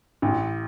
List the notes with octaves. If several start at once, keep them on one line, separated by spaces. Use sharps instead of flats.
A1